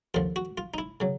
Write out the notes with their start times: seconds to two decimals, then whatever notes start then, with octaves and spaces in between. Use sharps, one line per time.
0.14 D#2 D3 F3 F4
0.36 F#4
0.58 F4
0.74 D#4
0.78 E4
1.00 C#3 F#3